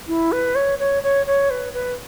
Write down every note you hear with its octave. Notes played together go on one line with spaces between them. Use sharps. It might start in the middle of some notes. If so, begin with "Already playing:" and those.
E4
B4
C#5
C#5
C#5
C#5
B4
B4